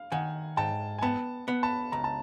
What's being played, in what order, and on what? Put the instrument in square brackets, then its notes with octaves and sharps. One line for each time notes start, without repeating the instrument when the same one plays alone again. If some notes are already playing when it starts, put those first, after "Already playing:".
Already playing: [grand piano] F5
[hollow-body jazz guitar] D#3 [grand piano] F#5 G#5
[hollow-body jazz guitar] G#2 [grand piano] G5 A5
[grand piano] G#5
[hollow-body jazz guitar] B3 [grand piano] G5 A5
[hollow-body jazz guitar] B3
[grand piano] A5 B5
[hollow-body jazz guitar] C#2 [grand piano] A#5
[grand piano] A5